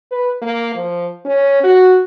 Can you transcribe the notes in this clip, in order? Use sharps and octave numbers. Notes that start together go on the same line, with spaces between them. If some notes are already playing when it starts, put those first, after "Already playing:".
B4
A#3
F3
C#4
F#4